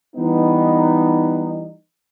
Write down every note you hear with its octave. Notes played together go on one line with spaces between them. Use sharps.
E3 G3 B3 D#4